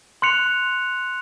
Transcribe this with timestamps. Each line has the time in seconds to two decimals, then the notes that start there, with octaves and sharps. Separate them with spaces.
0.22 C6 F#6 C#7 F7